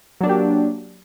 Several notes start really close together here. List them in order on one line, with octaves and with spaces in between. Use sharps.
F#3 D4 A#3 G4